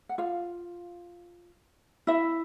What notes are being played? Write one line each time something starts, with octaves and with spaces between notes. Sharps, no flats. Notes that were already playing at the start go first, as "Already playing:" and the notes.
F#5
F4 F5
E4 E5